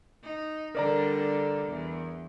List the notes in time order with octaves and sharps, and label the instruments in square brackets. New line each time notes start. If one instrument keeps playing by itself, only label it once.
[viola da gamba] D#4
[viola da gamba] D3 G3 D4 [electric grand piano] A#4 D5 A#5
[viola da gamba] E2